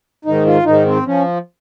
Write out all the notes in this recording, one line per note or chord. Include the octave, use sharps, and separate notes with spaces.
G#2 D#3 D#4
F4
G#2 D#3 D#4
C4
F3 C#4